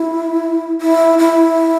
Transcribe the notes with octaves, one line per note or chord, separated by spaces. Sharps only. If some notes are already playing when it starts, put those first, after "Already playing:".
Already playing: E4
E4
E4